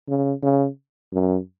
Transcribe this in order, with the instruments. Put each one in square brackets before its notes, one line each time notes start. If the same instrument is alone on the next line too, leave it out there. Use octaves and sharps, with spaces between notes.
[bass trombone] C#3
C#3
F#2